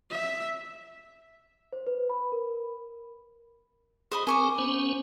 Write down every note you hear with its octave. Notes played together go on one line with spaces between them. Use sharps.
E5
C5
B4
B5
A#4
G#4 C5 D#5 B5
C4 A#4 G#5 C#6 D6
B3 C#4 C5